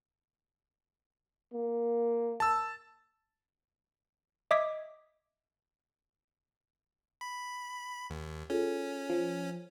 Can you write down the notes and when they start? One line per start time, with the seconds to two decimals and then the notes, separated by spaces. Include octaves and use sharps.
1.53 A#3
2.40 A5 E6
4.51 D#5 E5 D6 D#6 G#6 B6
7.21 B5
8.10 D#2
8.50 C#4 F4 G#4 A4
9.10 F3